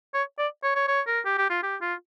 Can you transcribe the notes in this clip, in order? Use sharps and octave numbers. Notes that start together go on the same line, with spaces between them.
C#5
D5
C#5
C#5
C#5
A#4
G4
G4
F4
G4
F4